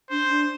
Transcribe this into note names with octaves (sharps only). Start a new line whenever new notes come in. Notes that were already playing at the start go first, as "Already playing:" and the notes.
D4 C5
D4